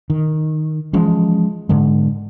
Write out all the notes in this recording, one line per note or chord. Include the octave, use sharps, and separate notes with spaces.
D#3
E3 F3 G#3 C#4
G#2 D3 G#3